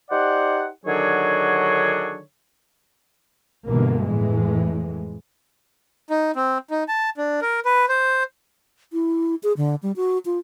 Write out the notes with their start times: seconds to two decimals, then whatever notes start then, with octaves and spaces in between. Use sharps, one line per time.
0.10 D#4 G4 C5 D5 F#5
0.85 D3 D#3 F#3 D4 G#4 C#5
3.68 G1 B2 D3 E3 A#3
4.05 F2 A2 E3 G#3
6.10 D#4
6.36 C4
6.70 D#4
6.88 A5
7.17 D4
7.41 A#4
7.65 B4
7.88 C5
8.93 E4
9.43 G#4
9.57 D3
9.83 G3
9.96 F#4
10.25 F4